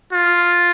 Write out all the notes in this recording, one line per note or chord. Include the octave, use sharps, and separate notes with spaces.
F4